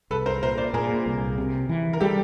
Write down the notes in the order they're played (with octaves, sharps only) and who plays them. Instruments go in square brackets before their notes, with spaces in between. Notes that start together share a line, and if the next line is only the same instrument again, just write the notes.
[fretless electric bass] C2 [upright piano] A4 B4
[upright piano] A#4 C5
[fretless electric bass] A#2 [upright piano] A#4 C5
[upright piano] C5 D5
[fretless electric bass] A#2 [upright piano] G#4 A#4
[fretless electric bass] C2
C3
E3
[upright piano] A#4
[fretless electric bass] G3 [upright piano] G4 A4